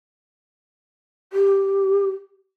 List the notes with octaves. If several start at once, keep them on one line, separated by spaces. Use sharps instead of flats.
G4